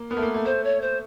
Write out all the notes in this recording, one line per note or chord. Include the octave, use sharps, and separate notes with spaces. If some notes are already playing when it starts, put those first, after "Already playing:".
Already playing: A#3
B3 A#4
A3
A#3
A3
A3 C5
C#5
C5